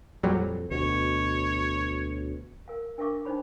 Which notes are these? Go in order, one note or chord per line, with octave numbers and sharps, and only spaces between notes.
F2 A#2 F#3 G3
D2 B2 C#5
A#4 F5
D4 A#4 E5 F5 C#6 D6
D4 D#4 C5 C#5 B5